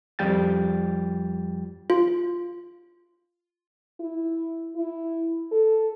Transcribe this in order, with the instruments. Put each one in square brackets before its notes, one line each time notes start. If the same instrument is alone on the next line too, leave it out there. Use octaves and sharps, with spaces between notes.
[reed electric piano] F2 F3 G3 G5 A6
[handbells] F4
[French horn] E4
E4
A4